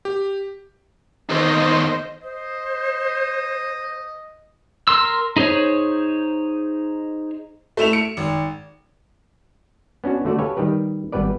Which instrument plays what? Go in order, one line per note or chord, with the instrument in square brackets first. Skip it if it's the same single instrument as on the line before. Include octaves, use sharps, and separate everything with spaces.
[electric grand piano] G4
[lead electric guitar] E2 D#3 [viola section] C5 D#5
[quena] C5 [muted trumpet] D#5
[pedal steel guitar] A#4 C6 E6
D#4 G#4 C5 C#5
[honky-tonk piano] A3 E4 E7 F7
C#7
G#1
[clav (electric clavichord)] B3 C#4 D4 F#4
D3 A3 F#4 D5
G4 A4 B4 C#5 F5 G#5
D#3 G3 G4 B4
G#1 G3 B3 B4 D5